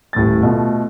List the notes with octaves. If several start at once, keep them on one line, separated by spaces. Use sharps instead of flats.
D#1 A2 A3 A6
B2 A3 F4